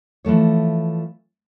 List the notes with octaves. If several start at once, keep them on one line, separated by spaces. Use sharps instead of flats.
E3 F3 A3 C#5